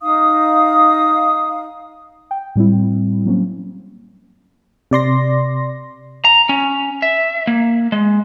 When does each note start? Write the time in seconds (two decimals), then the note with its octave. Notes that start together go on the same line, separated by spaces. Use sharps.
0.02 D#4 F5 D#6
2.31 G5
2.56 A2 G3 C4 E4
3.26 F#3 A#3 C4 C#4
4.91 C3 D5 C6 A#6
6.25 A#5
6.49 C#4
7.02 E5
7.47 A#3
7.92 G#3